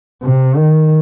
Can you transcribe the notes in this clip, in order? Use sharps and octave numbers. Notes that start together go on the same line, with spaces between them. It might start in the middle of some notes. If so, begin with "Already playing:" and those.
C3
D#3